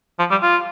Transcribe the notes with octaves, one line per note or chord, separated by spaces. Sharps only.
F3
G3
F4